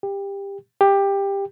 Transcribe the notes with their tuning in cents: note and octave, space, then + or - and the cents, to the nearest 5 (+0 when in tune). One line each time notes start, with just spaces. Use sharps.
G4 +20
G4 +15